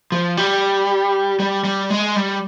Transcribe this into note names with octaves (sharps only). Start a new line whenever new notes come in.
F3
G3
G3
G3
G#3
G3